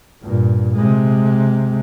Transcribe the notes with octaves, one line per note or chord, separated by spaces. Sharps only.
G2 A#2
C3 G#3